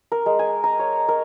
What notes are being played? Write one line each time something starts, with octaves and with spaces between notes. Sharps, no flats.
A#4
G#3
G#5
A#5
C#5
A#4